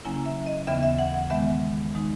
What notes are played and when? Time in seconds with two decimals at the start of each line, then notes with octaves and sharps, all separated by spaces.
0.05 C#3 F#3 A#3 C#4 E4 G#5
0.26 E5
0.46 D#5
0.67 D#2 C#3 E3 B3 E5
0.83 E5
0.99 F#5
1.14 F#5
1.30 D#3 G#3 B3 E5
1.94 D#3 G#3 D#4